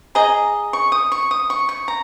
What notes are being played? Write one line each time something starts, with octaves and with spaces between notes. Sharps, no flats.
G#4 D#5 A#5
C#6
D#6
C#6
D#6
C#6
C#6
A#5